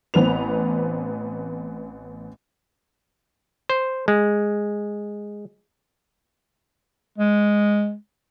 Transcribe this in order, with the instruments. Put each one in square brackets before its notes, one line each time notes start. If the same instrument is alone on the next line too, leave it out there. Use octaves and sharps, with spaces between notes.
[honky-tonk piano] A1 B3 C4 B4 F7
[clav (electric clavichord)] C5
G#3
[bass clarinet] G#3